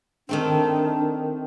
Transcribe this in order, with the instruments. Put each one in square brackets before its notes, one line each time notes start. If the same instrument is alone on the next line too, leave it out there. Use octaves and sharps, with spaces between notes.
[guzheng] D#3 A3 C4 [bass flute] D4